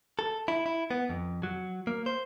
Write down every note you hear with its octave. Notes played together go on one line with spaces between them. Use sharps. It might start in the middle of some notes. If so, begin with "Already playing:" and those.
A4
E4
E4
B3
F2
F#3
A#3
C5